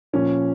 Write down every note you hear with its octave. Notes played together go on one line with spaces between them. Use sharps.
A#2 F3 C#4